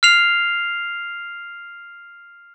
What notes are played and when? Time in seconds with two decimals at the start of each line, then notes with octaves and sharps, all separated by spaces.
0.03 F6 C7 F7